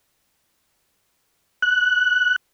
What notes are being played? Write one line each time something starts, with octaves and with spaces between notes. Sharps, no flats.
F#6